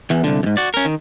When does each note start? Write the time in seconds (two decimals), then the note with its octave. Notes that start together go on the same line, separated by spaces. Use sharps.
0.10 E2 E3
0.24 C2 D3
0.43 F2 G#2
0.57 F#4 D5
0.74 C#4 A#4
0.85 D#3